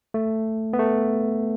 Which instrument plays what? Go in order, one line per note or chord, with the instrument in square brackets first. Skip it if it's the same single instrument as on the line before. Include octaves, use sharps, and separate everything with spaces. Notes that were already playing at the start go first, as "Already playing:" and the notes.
[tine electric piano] A3
B3
A3